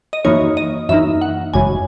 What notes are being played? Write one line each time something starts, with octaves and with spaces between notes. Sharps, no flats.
D#5
F#2 E3 A#3 D#4 C#5
D#5
F#2 E3 A#3 D#4 E5
F#5
G#1 F#2 C#3 E3 G#5